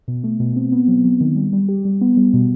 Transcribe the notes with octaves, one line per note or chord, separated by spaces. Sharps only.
B2
A3
B2
C4
B3
F#3
F#3
D#3
G3
G3
G4
G3
B3
G3
B2